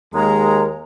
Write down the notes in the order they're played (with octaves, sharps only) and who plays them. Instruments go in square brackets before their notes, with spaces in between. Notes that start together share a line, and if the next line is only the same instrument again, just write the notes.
[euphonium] D#2 [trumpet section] G#3 [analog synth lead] A#4 [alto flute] A#5